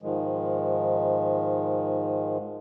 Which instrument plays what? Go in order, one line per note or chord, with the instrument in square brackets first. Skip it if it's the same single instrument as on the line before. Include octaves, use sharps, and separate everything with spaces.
[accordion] G#2 D#3 F3 G#3